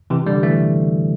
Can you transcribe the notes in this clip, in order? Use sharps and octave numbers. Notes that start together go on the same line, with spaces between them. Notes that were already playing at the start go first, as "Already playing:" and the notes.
C3 E3
D3 G3
E3 A3